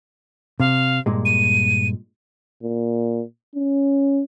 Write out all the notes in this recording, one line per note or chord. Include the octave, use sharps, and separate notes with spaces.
C3 F5
G2 A#2 G#3
D#7
A#2
C#4